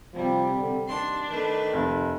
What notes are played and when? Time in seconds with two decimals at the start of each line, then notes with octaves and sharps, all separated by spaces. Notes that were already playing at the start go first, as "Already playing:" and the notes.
0.14 C3 F3 G3
0.56 D3
0.88 D#2 D4 C6
1.30 D#3 A3 B4
1.73 F1